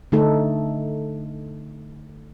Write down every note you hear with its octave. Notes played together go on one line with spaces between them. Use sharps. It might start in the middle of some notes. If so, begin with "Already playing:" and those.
D3 A3 D#4 A4